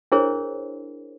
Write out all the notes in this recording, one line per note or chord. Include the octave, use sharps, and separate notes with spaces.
D4 E4 G#4 A#4 C5 C#5